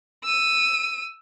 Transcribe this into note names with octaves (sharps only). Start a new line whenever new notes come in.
E6 D#7